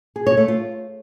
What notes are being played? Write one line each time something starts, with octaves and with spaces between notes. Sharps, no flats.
G#4
C#5
A3
F4